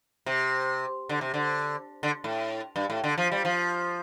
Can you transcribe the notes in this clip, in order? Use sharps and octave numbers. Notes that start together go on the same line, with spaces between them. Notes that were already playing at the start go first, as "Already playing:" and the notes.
C3
D3
C3
D3
D3
A2
G2
A2
D3
F3
G3
F3